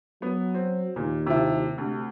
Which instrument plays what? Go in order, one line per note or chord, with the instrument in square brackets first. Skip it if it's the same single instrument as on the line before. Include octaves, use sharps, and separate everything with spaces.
[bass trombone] F#3 [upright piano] B3
[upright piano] C4
[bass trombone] D#2 [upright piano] A#2
[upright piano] C3 F3 E4
[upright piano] D2 [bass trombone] C3